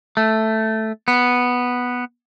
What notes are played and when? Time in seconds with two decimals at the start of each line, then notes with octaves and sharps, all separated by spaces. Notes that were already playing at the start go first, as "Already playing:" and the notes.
0.17 A3
1.08 B3